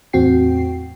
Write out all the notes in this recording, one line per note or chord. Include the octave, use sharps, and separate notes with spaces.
E2 A2 C4 F#4 G5 C7